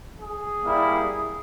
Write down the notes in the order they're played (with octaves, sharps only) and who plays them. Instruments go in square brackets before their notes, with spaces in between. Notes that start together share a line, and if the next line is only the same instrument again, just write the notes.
[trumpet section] G#4
G3 A#3 E4